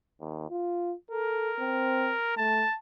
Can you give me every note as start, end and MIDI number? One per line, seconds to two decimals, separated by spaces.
0.20 0.47 39
0.50 0.94 65
1.11 1.51 69
1.11 2.35 70
1.59 2.13 60
2.37 2.65 57
2.37 2.76 81